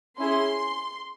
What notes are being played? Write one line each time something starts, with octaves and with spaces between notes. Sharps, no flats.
C#4 E4 G#4 C6